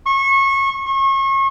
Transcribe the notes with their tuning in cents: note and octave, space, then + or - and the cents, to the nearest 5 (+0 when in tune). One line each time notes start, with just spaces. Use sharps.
C#6 -25
C#6 -35